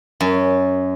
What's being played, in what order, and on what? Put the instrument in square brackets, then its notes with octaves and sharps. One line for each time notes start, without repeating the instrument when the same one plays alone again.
[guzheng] F#2